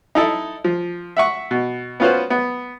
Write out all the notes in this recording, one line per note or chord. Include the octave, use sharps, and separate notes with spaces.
D#4 E4 A4
F3
E5 F#5 C#6
B2
B3 C#4 F4 F#4 B4 C5
B3